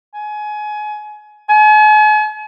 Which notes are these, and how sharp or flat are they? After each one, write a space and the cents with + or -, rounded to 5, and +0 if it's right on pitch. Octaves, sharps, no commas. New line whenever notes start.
G#5 +25
G#5 +45